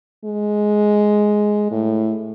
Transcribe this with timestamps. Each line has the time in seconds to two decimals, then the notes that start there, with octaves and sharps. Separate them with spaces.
0.25 G#3
1.71 A2